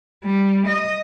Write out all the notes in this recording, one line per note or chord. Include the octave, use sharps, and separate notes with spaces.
G3
D#5